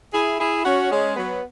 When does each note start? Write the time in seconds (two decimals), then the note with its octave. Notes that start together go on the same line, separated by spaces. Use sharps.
0.13 E4 G#4
0.39 E4 G#4
0.65 C#4 F#4
0.90 G#3 C#4
1.16 F#3 B3